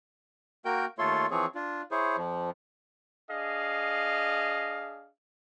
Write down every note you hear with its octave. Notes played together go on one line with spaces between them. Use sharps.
A#3 F#4 A#4 G5 G6
D#2 A3 F4 A4 C#5 C6
E3 F3 C4 G#4 C#5
D4 F4
E4 G#4 C5 C#5
F2 F3
D4 G#4 D#5 F5